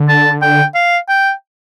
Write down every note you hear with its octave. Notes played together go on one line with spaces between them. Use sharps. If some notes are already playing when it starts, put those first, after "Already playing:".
Already playing: D3
A5
G5
F5
G5